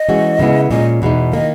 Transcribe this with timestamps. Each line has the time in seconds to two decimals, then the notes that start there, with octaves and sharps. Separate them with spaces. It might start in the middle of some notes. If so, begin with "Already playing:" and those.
Already playing: D#5
0.09 E3 G#3 C#4 F#4
0.39 C#3 G#3 B3 E4
0.71 A#2 G#3 C#4 D#5
1.02 E2 B2 G#3 D#4
1.33 D#3 A#3 D#5